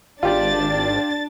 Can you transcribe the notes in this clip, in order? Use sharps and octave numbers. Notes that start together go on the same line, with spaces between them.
G#1 D4 F4 G4 D5 A6